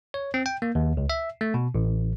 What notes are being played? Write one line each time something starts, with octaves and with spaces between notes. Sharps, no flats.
C#5
C4
G5
A#3
D#2
C#2
E5
A3
B2
A1